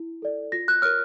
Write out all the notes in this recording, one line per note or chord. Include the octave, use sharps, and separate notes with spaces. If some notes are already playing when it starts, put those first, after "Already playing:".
Already playing: E4
A4 D5
F4 A#6
F#6
A#4 C#5 F6